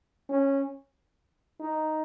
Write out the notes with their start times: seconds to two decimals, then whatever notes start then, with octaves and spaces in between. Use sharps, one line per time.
0.30 C#4
1.60 D#4